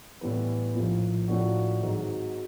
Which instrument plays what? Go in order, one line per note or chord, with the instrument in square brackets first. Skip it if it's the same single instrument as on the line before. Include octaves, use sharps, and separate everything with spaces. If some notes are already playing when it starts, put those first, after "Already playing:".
[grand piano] A2 E3 G3 B3
A#1 A2 F3 A#3
A2 F3 A#3 D4 F#4
G#1 G#2 D#3 F#3